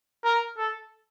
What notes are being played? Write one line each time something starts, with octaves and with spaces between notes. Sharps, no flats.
A#4
A4